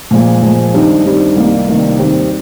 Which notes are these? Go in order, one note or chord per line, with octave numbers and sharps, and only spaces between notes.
A#2 F3 G#3
A#2 F3 G#3
G2 D#3 G3 C4 D#4
G2 D#3 G3 C4 D#4
C2 C3 D#3 A#3 D#4
C2 C3 D#3 A#3 D#4
D#2 D#3 G3 C4 G4